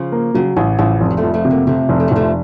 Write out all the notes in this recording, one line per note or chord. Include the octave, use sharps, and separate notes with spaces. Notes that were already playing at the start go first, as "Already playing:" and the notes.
Already playing: C#3 F3
A#3
C#3 F#3
A1 C#3
A1 C#3 F3
F1
F#3
F3 A3
F2
F3 A3
C3
F#3 A#3
C3 F3 A3
F1
A3
F#3
F1 F3 A3